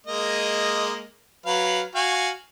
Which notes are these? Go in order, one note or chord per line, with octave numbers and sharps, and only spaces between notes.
G#3 A#3 D#5
F#3 B4 F5
F#4 F5 G#5